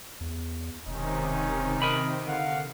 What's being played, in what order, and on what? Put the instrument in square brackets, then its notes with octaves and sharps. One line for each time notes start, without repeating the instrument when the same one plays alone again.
[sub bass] E2
[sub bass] E1 [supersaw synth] C3 D#3 [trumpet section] C#4 D#4
[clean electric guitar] A#4 D#5 B5
[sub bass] D3 [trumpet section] F5 F#5